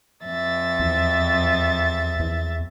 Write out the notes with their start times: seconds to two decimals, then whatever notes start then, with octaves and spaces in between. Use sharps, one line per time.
0.24 F2 E5 A6
0.80 E2
2.20 E2